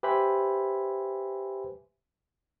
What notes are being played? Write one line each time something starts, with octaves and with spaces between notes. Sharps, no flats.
G4 B4 C5 E5 G#5 B5